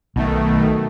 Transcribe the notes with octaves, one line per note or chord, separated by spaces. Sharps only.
B1 B2 D#3 A3